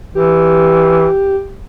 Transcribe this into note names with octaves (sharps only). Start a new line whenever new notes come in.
E3 G4